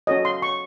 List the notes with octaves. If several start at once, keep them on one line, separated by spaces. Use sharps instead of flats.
C#4 F#4 A4 C#5 D#5
C6
C#6